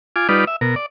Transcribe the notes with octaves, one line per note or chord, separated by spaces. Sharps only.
F4 G#5 D6
G3 D#4 F4 B4 D5
E5
B2 A#4
D5